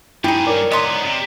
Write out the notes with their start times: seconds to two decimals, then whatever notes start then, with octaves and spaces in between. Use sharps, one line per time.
0.24 G2 D#4 E4 G4 G#4
0.47 A#4 C#5 D5
0.72 G#2 B3 D#5 A#5 C6
1.05 C3